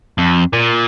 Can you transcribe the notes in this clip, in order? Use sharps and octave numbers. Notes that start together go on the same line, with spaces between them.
F2
A#2